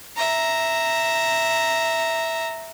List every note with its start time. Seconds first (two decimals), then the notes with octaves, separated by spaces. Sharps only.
0.17 E5 A#5